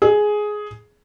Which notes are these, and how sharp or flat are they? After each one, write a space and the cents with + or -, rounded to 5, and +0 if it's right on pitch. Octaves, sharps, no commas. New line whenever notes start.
G#4 +10